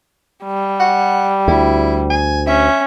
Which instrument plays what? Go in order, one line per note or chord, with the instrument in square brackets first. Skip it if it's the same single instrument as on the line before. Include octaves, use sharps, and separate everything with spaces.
[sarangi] G3
[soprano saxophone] F#5
[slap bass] D2 [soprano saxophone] E4
[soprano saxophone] G#5
[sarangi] C#4 [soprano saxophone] E5